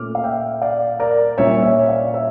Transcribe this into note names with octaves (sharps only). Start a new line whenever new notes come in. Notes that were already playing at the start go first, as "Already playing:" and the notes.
Already playing: A#2 A3 C#4 D6 F6
F5
E5 G5
D5 F5
A#4 D5
A#2 G3 C#4 C#5 E5
C#5 E5
D5 F5
C#5 E5